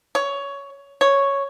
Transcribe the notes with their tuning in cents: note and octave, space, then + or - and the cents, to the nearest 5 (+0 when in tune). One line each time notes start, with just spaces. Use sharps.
C#5 +15
C#5 +0